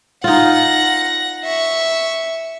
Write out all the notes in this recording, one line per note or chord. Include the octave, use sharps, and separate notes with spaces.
D#4 F4 F#5 A#6
E5 C#6